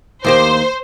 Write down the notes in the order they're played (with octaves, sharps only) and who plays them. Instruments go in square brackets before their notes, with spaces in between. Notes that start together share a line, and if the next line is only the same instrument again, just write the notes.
[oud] D#2 A#3 G4 [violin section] C5